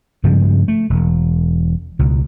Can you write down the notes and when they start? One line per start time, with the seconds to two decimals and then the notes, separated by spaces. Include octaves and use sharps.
0.24 G2 C#3 F3 G#3
0.68 A3
0.90 E1
1.99 C#2 B2